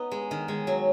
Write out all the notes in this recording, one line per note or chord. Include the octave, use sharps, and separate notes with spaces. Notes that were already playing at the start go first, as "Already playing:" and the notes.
Already playing: B3 D#4
G#3
D#3
G#3
F#3